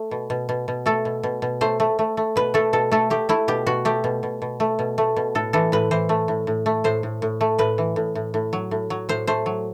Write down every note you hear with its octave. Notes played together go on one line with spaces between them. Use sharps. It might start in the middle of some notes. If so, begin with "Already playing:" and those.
Already playing: A3
B2
B2
B2
B2
A3 A4
B2
B2
B2
A3 C5
A3
A3
A3
B2 B4
A3 A4
B2 A4
A3 A4
A3 G4
A3 E4
B2 G4
B2 F#4
A3 G4
B2
B2
B2
A3
B2
A3
B2
A2 A4
E3 A4
A2 B4
E3 C5
A3
A2
A2
A3
A2 C5
A2
A2
A3
A2 B4
E3
A2
A2
A2
F#3
A2
F#3
A2 C5
A3 C5
F#3